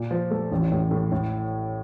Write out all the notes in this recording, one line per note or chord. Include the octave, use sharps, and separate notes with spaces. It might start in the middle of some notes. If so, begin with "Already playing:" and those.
Already playing: A#2
F3
A3
A1
A2
A2
A2